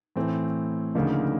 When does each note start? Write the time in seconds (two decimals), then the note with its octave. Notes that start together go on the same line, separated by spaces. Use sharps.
0.16 A2 E3 A3 C4
0.95 D2 C#3 F3 A#3 D#4